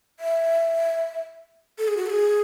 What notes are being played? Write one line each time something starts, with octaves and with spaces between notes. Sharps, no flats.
E5
A4
G#4
F#4
A4
G#4